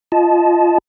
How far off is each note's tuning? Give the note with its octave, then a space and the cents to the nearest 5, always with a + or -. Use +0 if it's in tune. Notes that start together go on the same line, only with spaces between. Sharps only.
F4 -15 D#5 +0 A5 -25